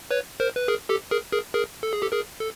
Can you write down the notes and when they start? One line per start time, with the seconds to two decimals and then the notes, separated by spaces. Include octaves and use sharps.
0.11 B4 C#5
0.40 A#4 C5
0.56 B4
0.68 G#4 A#4
0.89 G4 A4
1.11 G#4 A#4
1.32 G#4 A#4
1.54 G#4 A#4
1.83 A4
1.93 G#4
2.02 G4 A4
2.12 G#4 A#4
2.40 A4